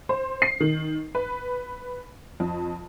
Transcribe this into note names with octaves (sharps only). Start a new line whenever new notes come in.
C5
C7
D#3
B4
F2